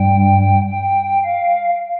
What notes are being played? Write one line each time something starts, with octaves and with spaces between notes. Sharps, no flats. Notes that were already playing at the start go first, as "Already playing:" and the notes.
Already playing: G2 G3 G5
G5
F5